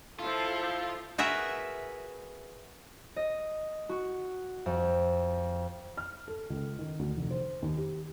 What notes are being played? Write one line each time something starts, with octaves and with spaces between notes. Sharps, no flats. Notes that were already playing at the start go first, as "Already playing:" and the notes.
F3 E4 F4 A4
F#4 G#4 A#4 B4 E5
D#5
F#4
F2
F6
A4
C#2
D#3
D2
F1
C5
D#2
G4